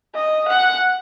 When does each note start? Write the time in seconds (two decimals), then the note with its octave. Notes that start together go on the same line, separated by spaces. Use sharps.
0.15 D#5
0.48 F#5